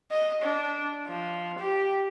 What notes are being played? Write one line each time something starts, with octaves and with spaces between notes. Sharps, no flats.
D#5
D4
F3
G4